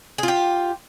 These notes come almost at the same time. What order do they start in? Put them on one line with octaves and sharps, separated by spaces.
G#4 F4 G4